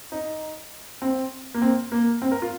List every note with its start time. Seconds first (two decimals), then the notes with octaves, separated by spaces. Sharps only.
0.12 D#4
1.02 C4
1.54 A#3
1.62 C4
1.92 A#3
2.22 C4
2.32 A#4
2.42 F4